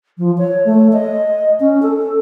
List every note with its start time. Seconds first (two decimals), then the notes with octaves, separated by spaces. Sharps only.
0.18 F3
0.38 C#5
0.65 A3
0.93 D#5
1.60 C#4
1.82 A4